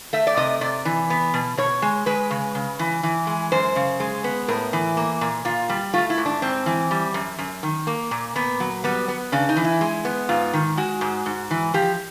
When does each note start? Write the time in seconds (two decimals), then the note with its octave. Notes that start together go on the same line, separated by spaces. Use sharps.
0.13 A3 E5
0.27 D5
0.37 C3 D#5
0.61 C3 D5
0.85 E3
1.10 B3
1.34 B2
1.57 B2 C#5
1.82 G#3
2.06 G#3 B4
2.31 C#3
2.55 C#3
2.79 E3
3.03 E3
3.27 G#3
3.52 F#2 C5
3.76 C#3
4.00 G#3
4.24 B3
4.48 A2 A#4
4.73 E3
4.97 A#3
5.21 A#2
5.45 A#2 F4
5.69 G3
5.94 A3 F4
6.10 E4
6.18 G#2
6.26 D4
6.42 G#2 C4
6.66 E3
6.91 G3
7.14 F#2
7.38 F#2
7.63 D#3
7.87 A#3
8.11 A#2
8.35 A#2 B3
8.60 F#3
8.84 G3 B3
9.08 B3
9.32 C#3 D4
9.49 D#4
9.56 E3
9.65 E4
9.81 G#3
10.05 B3
10.29 G#2 F4
10.53 D#3
10.77 G#3 F#4
11.01 G#2
11.26 G#2
11.51 E3
11.74 F3 G4